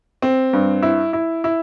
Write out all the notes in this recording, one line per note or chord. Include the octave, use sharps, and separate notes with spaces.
C4
G2
E4
E4
E4